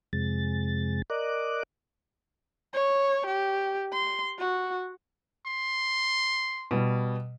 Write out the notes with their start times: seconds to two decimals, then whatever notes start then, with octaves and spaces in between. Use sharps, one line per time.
0.13 F2 C3 G#3 A6
1.10 A#4 D5 D#5 D6 F#6
2.74 C#5
3.27 G4
3.93 C6
4.39 F#4
5.46 C6
6.71 B2 G3